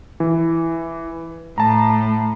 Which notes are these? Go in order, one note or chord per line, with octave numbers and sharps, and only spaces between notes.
E3
A2 A5 A#5